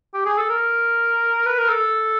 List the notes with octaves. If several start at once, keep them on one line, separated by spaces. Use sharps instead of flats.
G4
G#4
A4
A#4
B4
A#4
A4